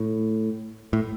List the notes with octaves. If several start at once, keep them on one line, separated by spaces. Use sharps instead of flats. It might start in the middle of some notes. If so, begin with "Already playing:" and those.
Already playing: A2
A2